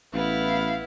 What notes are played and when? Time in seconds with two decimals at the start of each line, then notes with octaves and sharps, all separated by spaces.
0.14 A1 B3 E4 F5